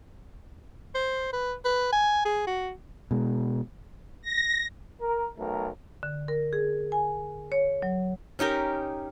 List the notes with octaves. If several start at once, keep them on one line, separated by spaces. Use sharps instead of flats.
C5
B4
B4
G#5
G#4
F#4
B2 G#3
A#6
A#4
B1 A3 A#4
D3
A#4
G#4
G#5
C#5
F#3
C#4 D#4 G4 A#4